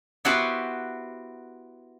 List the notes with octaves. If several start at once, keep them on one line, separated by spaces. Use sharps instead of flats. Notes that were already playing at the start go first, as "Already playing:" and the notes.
B3 E4 F#4 G4 B4 C5